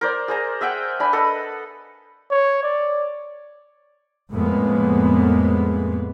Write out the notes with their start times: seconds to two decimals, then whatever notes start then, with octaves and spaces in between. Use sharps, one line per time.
0.01 A#4 C5 D5
0.28 G#4 C5 A#5
0.61 G#4 E5 F#5 G5
0.99 D4 G#5 B5
1.13 A4 B4 D#5 D#6
2.31 C#5
2.63 D5
4.32 F2 A2 G#3 A#3 B3